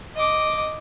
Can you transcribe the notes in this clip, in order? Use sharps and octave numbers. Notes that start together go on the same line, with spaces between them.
D#5 D6